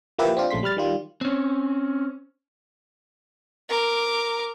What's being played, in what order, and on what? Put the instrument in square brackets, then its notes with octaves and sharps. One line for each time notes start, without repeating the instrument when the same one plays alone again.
[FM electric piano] F3 A#3 E4 G4 B4 E5
C4 D4 F4
A#1 C#3 A3 C6 B6
G3 B5 F6 A6
D#3 G3 F4
[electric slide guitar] C4 C#4
[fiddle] A#4 D6